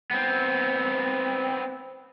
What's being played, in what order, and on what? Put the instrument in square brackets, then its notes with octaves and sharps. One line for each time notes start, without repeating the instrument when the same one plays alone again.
[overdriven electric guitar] B3 C4